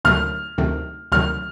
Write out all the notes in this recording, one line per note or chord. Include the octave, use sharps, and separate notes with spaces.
D2 C3 D#3 F#3 A3 F6
D2 C3 D#3 F#3 A3
D2 C3 D#3 F#3 A3 F6